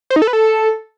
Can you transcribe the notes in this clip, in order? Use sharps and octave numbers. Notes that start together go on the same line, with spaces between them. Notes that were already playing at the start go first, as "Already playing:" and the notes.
C5
D#4
A4
B4
A4